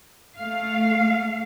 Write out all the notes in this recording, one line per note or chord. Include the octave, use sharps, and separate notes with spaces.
A3 F5